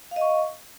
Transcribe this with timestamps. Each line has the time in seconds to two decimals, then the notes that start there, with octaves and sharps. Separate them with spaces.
0.11 F5
0.16 D#5
0.21 C#6